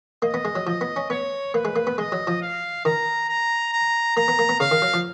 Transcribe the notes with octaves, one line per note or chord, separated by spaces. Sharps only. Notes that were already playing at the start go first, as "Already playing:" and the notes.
A#3 D#5
B3
G#3
F#3
F3 D#5
B3
C#4
B3 C#5
A#3 B4
G#3
A#3
B3
G#3 D#5
F#3
F3
F5
D#3 A#5
A#5
A#5
A#3 A#5
B3
A#3
B3
C#3 F5
D#3
F#3
F3